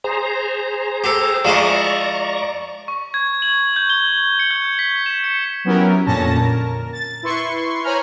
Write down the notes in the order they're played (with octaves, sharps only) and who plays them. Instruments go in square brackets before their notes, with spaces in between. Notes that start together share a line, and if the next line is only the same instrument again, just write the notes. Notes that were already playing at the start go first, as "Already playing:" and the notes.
[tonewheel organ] G#4 C5 A#5
[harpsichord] G4 A4
[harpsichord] F3 G#3 E4 [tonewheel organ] D5 A#5 C#6
[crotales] C#6
G#6
F#7
G6
G7
C#7
G6
B6
E7
C#7
[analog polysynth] F#3 B3 C#4 E4 G4 A#4
F2 A#2 D3 C#4 A5 A#6
A#4
A6
E4 B4 C6 C#6
C5 C#5 G#5 A#5 B5 F6